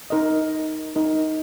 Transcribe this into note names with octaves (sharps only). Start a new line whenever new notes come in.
D#4 A#4 D#5
D#4 A#4 D#5